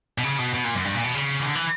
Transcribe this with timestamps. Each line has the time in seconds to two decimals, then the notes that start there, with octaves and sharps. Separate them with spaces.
0.18 B2
0.24 C#3
0.39 B2
0.54 B2
0.64 A#2
0.75 F#2
0.85 G2
0.95 A#2
1.04 B2
1.14 C#3
1.40 E3
1.46 D3
1.55 E3